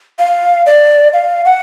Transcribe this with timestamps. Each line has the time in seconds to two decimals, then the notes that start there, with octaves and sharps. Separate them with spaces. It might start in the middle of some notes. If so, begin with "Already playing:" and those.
0.19 F5
0.66 D5
1.13 F5
1.45 F#5